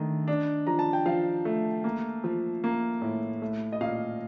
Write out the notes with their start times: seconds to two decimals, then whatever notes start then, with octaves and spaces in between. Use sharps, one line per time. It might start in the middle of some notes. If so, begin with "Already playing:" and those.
Already playing: D#3 A3 D4 D#5
0.28 D4
0.67 F3 A#5
0.79 A5
0.93 G5
1.06 F3 F5
1.45 A3
1.84 A#3
2.24 F3
2.64 A#3
3.02 A2
3.42 A3
3.73 D#5
3.81 A#2 F5